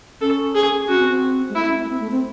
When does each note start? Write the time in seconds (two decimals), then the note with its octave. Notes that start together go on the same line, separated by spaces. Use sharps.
0.21 C#4 A4
0.55 G#4
0.88 C#4 F#4
0.99 C4
1.10 C4
1.49 G#3
1.55 A3 E4
1.67 C#4
1.78 C4
1.85 A3
1.89 C4
2.00 A3
2.11 C4